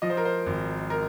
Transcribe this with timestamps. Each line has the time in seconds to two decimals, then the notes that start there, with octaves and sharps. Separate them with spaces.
0.02 F3 D#5
0.10 C5
0.17 A#4
0.25 C5
0.46 G#1
0.90 A#4